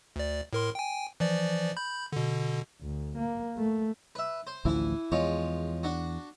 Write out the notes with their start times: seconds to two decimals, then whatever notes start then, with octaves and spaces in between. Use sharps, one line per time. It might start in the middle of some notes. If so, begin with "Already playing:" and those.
0.16 D2 D5
0.53 A2 A#4 C6
0.75 G5 G#5
1.20 E3 F3 D5
1.77 B5 G6
2.12 B2 D3
2.81 D2
3.18 A#3
3.57 A3
4.15 B4 E5
4.47 C5
4.65 A1 D2 E3 F3 E4
5.12 E2 F3 G#3 C#5
5.83 D4 F#4